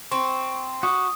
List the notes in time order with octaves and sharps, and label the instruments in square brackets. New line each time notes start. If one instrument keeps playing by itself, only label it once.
[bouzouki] C4 [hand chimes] C#6
[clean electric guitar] F#4 [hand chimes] D#6